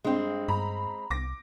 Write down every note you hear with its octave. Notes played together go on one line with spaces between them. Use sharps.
G2 G#3 C4
G2 A#5 B5
C2 D6 A#6